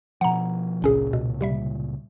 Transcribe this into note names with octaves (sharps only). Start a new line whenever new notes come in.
B2 F3 F#5 A#5
G#1 C#2 A#2 C#3 C#4 G#4
B2
C3 G3 E5